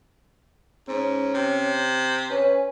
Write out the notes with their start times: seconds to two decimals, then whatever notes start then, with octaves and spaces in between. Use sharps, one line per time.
0.88 G#2 C#4
1.34 C3
2.30 C#4 B4